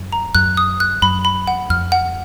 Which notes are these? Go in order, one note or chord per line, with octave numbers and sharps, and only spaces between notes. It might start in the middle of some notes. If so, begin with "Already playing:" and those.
Already playing: F#2
A#5
F#2 F#6
D#6
F#6
F#2 B5
B5
F#5
F2 F6
F#5